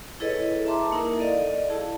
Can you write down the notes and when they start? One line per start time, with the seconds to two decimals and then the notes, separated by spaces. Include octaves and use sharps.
0.20 E4 G#4 A4 B4 C#5 D#5
0.65 E5 A5 A#5 C6 D6
0.91 A#3 D#4 E4 A#4
1.18 A4 D5 D#5 F5
1.69 E4 G#4 A5